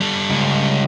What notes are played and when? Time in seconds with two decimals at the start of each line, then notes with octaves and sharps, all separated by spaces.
0.01 G3 A4
0.30 C#2